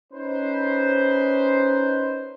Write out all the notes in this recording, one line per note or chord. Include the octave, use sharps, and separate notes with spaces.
C#4 D#4 B4 C5